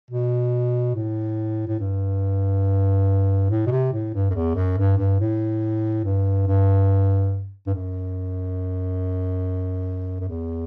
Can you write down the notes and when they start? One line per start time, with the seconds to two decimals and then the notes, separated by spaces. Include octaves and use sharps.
0.11 B2
0.95 A2
1.68 A2
1.79 G2
3.50 A2
3.67 B2
3.71 C3
3.92 A2
4.14 G2
4.30 F#2
4.34 E2
4.55 F#2
4.77 G2
4.98 G2
5.20 A2
6.05 G2
6.47 G2
7.66 G2
7.74 F#2
10.20 F#2
10.29 E2